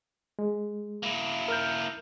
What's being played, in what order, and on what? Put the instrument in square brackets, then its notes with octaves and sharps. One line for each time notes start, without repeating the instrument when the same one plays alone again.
[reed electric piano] G#3
[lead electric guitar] A#3 E4
[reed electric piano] A#4 F6 G6